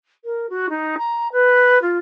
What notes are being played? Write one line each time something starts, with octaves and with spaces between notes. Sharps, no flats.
A#4
F#4
D#4
A#5
B4
F4